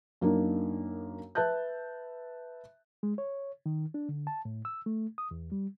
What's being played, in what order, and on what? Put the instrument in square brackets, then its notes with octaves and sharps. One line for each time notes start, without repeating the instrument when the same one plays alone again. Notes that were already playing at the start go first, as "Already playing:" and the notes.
[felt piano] F#2 A#3 D4 D#4
B4 E5 A5 F#6 G6
[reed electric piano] G#3
C#5
D#3
D4
D3
A5
A2
E6
A3
D#6
E2
G3